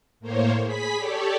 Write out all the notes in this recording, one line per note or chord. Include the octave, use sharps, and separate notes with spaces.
A2 A#3 C5 C#5
G#4 B5 B6
G4 A4 C#5 D5